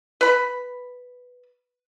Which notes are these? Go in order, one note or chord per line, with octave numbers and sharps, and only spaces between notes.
B4 B5